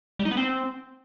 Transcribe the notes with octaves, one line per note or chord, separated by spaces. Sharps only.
G3
D#4
B3
C4